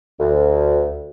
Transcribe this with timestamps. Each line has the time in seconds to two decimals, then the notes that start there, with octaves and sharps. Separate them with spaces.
0.20 D2